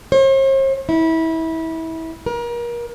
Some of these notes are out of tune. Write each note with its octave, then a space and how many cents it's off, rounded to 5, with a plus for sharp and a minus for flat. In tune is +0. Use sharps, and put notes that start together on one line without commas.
C5 +45
E4 -25
A#4 +35